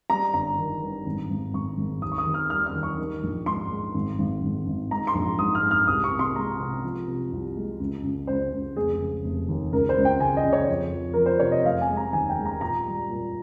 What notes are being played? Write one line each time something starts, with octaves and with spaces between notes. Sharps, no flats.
G3 A#5
G1 A#5
D#3
G2
G#1
G#1
G#1 C#6
G#1
D#2 D#6
C#6
D#6
D#2
F6
G3 F6
F6
D#2
C#6
D#3
A#1
G#2 C6
G#3
G#1
G#1
G#1
G#1
G#2 A#5
C6
A#1
G#2 D#6
F6
G#2
F6
C2 D#6
C#6
C3
C6
G#3 A#5
C3
F3
C3
C2
G#3
C#2
C#2
C#2 C5
C#2
F1 G#4
C#3
F1
D#2
C#2 A#4
C5
C#2
G5
C#3 G#5
D#5
C#3
C#5
F2
F3
F3 A#4
C5
C3 C#5
D#5
F1 F5
G#5
G#3
A#5
D#2 G#5
G5
G#3
A#5
A#2 A#5
G3
A#2